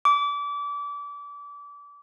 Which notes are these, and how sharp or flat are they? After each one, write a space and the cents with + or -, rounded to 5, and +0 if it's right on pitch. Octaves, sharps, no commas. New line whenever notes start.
D6 -30